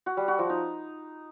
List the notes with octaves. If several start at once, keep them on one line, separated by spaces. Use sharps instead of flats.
F#4
G3
F#4
F3
D#4